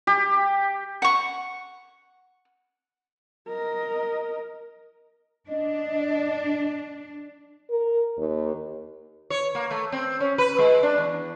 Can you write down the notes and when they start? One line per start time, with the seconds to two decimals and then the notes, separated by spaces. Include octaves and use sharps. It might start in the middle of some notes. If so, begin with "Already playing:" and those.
0.07 G4
1.02 F#5 C#6
3.49 A#4 D#5
5.49 D4 D#5
7.70 A#4
8.18 D#2
9.30 C#5
9.55 A#3
9.71 A3
9.92 C4
10.20 C#4
10.38 B4
10.58 G#3
10.83 D4
10.98 E2